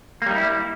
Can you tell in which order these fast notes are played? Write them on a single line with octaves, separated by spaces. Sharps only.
A#3 G3 D#4 E4